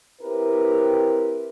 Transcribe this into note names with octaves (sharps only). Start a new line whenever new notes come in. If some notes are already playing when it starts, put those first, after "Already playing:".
C4 E4 G4 A#4 B4